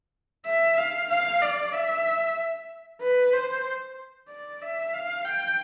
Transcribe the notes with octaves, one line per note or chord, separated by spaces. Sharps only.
E5
F5
F5
D5
E5
B4
C5
D5
E5
F5
G5